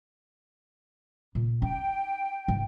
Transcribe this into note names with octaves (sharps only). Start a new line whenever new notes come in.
A#2
D#4 G5
G#2